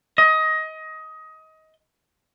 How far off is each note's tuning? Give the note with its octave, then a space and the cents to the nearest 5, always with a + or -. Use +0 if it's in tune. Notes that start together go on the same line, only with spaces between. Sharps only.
D#5 +20